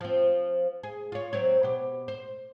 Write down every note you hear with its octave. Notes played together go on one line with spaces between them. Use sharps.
F3 C4
G#4
F4 C#5
F#3 C4 C#5
B2 G4
C5